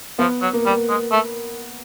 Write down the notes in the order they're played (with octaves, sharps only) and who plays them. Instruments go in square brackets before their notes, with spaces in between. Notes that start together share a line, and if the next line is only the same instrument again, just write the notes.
[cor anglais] F3 [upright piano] B3
[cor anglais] F#3
[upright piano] A#3
[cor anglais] G3
G#3
A3